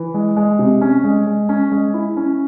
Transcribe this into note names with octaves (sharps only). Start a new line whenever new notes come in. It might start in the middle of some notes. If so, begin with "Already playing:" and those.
Already playing: E3
G#3
G#3
C3
C#4
G#3
G#3
C#4
G#3
E4
C#4